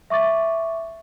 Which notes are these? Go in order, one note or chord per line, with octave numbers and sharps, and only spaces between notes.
E5 C#6 D6 A6